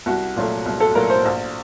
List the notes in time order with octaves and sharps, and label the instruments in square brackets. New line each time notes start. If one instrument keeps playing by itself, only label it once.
[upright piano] C2 F#4
A#2 F#3 A3
C2
A4
A#2 F#3 A3 A#4
C5
A#1